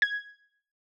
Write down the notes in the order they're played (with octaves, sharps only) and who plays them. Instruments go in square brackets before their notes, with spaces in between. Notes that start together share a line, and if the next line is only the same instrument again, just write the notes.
[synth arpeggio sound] G#6